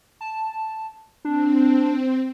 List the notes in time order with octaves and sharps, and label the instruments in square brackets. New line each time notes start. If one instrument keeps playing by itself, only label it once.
[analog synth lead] A5
[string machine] C4 [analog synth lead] D4